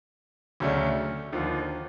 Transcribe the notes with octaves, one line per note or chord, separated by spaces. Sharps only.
D2 C#3 F#3 A3 D4
D#2 D3 F3